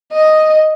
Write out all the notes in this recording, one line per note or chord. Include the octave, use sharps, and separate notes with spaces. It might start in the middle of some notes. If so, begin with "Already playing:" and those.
D#5